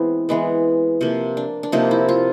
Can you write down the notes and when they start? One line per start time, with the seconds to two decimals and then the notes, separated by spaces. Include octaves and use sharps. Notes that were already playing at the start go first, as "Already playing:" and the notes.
Already playing: E3 G#3 B3 C4
0.29 E3 G#3 B3
1.01 C3 F3 A#3
1.37 D4
1.63 D4
1.72 C3 F3 A#3 D#4
1.91 E4
2.09 F4